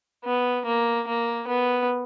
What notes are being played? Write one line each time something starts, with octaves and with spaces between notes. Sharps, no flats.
B3
A#3
A#3
B3